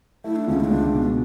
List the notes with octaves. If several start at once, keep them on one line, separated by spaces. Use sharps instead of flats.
A3 E4
D4
C#2 C#4
E4
D4
C#2
B2